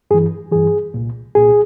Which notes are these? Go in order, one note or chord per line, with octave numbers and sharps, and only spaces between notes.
G2 E3 G#4
G2 E3 G#4
C2 A#2
C2 A#2 G#4